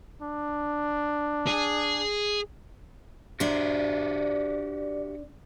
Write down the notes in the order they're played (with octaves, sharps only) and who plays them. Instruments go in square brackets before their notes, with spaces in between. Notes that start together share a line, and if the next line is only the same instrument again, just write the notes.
[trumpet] D4
[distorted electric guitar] G#4
[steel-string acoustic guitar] D4 C5 [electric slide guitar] F#4 G4 E5 [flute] D5